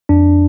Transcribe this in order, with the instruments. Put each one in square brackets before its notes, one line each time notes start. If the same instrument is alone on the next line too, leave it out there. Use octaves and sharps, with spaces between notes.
[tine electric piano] F2 D4